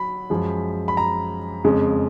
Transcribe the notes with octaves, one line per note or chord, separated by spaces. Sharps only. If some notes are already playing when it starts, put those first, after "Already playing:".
Already playing: F#3 B5
F#2 F3 G#3
B5
A#5
F2 C#3 G#3